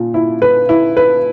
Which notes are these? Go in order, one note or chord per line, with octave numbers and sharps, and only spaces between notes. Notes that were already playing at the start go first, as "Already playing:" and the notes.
Already playing: A#2
E4
B4
E4
B4